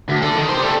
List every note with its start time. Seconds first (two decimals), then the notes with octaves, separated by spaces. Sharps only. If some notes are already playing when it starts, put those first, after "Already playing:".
0.09 D2
0.22 A4 D5
0.35 D#3
0.49 G4 C5
0.62 G3 A4